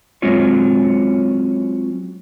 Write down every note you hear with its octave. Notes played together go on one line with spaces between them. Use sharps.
F#3 G#3 C4 C#4 F4 C#5